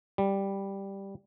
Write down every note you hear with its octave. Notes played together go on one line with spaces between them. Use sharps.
G3